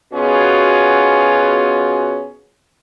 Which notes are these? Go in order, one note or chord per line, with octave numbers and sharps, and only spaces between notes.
B2 B3 C#4 F4 F#4 G#4